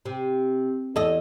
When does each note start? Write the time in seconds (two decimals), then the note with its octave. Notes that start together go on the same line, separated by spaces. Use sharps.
0.05 C3
0.96 E2 A4 D#5